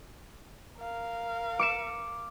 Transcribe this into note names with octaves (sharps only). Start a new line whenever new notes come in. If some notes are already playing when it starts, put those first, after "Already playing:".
A#4 F5
D6 C#7 E7